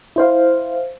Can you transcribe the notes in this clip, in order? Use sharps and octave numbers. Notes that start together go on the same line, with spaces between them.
E4 C5 F5